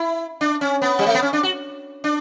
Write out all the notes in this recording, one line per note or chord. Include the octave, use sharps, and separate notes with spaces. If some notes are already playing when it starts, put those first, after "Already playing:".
Already playing: E4
D4
C#4
B3
G3
A3
B3
C#4
D4
F#4
D4